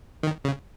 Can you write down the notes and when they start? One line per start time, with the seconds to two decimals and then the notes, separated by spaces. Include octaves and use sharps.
0.23 D#3
0.44 C#3